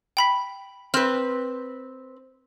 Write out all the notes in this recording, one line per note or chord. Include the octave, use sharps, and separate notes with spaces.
G5 B5 B6
C4 B4 F6